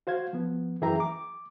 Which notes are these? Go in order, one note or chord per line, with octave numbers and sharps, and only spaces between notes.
F#4 C5 F5 G#6
F3 B3
F#2 E3 G#4 E5 G5 A#5
D6